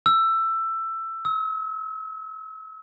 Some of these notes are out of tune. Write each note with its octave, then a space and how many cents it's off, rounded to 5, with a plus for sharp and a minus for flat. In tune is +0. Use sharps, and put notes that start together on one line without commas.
E6 +15
E6 -40